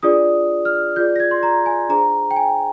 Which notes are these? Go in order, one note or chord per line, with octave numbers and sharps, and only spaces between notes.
D4 F4 G#4 D5 D#6
F6
F4 G#4 D5 G6
A#6
G#6
C6
A#5
G#5
D4 G#4 C5 A#5
G5
G#5